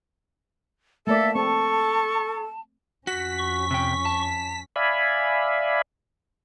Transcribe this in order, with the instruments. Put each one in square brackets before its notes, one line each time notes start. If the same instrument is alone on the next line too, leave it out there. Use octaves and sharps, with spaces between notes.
[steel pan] A3 A#3 D5 [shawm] A4 [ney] E5 [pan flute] A5
[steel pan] C4 [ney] A4 [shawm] C#6
[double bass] F2 C#4 [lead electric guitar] F#4 [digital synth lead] B6
[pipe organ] C#6
[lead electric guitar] C3 G5
A5
[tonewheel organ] D5 E5 F5 G#5 B5